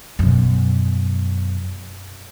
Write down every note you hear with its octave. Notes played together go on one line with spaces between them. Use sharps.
F#2 B2